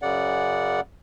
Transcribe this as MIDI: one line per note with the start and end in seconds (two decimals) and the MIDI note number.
0.02 0.81 42
0.02 0.81 49
0.02 0.81 74
0.02 0.81 78